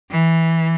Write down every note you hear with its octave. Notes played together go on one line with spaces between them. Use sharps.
E3